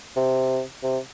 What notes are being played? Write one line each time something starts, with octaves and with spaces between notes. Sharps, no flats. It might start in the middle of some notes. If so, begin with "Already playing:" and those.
C3
C3